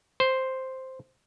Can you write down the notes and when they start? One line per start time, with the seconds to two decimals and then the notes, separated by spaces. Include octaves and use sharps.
0.20 C5